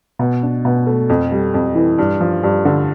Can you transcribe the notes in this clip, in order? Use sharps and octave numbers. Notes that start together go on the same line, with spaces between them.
B2
D4
B2
A3
F2
G3
F2
E3
G2
F3
G2
D3